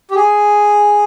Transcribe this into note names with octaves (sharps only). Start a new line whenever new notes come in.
G4
G#4